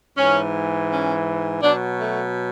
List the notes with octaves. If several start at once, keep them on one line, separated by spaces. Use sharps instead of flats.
G#2 E3 C#4
C#4
B2 F#3 D4
A3